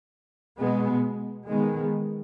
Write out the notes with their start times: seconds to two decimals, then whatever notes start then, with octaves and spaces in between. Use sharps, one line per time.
0.58 B2 G#3 B3
1.48 D#3 G#3 B3